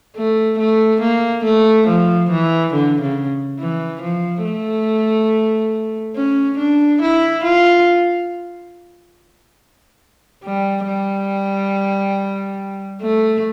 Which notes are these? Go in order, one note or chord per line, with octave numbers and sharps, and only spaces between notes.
A3
A3
A#3
A3
F3
E3
D3
C#3
E3
F3
A3
C#4
D4
E4
F4
G3
G3
A3